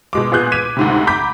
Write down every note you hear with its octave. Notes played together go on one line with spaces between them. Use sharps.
B2 G#3 D6
A#2 B3 G#4 F#6 G6
D6 G#6 B6 D#7
D2 G#2 C3
A#5 B5 D6 G6 B6